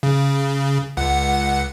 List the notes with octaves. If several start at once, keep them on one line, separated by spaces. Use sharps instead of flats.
C#3
C#2 F#5